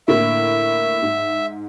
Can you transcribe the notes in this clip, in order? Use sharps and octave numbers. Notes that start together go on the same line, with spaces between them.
A2 D3 A#3 E5
G#2